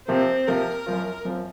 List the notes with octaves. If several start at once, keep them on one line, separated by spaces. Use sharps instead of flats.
C3 F3 A#3 C4
C3 F3 A#3 A#4
F#2 F3 C4 F4
F#2 F3 C4 F4